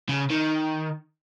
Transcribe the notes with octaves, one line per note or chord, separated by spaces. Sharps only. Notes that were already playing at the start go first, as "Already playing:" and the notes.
C#3
D#3